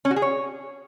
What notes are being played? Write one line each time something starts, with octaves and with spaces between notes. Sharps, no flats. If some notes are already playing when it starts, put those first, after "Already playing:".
C#4
F#4
G#4
C#5